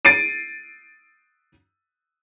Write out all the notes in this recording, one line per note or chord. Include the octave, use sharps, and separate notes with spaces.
A6 C7 D7 D#7